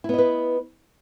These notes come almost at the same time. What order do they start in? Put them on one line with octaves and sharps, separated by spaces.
E4 B3 D#5 B4